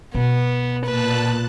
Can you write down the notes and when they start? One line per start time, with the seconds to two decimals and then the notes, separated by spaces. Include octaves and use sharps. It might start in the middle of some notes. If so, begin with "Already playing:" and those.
0.15 B2 B3
0.85 A#2 B4 A5 F#6